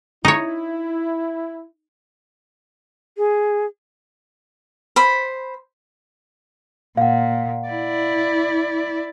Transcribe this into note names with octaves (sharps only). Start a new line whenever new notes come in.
D#4 E4 C#5
G#4
C5 B5
A#2 F5 F#5
E4 D5